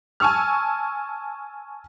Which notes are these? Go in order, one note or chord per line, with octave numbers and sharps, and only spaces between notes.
G#5 A5 C#6 E6 F6